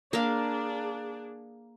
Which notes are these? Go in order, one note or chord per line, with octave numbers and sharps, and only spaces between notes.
A#3 D4 G#4 F5